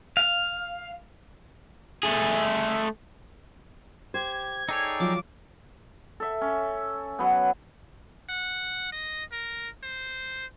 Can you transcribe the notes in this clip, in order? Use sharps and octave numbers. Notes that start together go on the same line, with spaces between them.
F5
A3 G#4
G4 C5 G#6
D#4 G#4 A4 C#5 D5 G5
F3 F#3 F4 D6
A4 E5
C#4
F#3 B3
F#5
D#5
A#4
C5